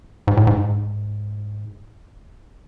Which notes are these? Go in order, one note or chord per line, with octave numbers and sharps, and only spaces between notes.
G#2
A2
G#2